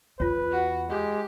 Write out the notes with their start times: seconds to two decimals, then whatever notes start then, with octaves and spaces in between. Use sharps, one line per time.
0.20 E2 F4 B4 C#5
0.51 F#4
0.90 G#3 G4